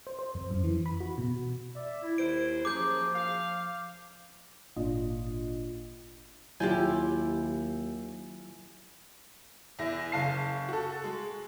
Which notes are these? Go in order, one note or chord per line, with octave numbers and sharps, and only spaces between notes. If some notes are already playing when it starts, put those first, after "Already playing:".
C5
C5
F2
F#2
E3
B5
F#4
B2
D5 E5
E4
D#2 C5 D7
F#2 F3 A#3 G#4 D6 G6
F5
G#1 A#2 D4 F4 D#5
D#2 F#3 E4 F4 G4 G#5 G6
E2 E4 A#6
F#1 F5 A5 C7
F#4 A4
G#3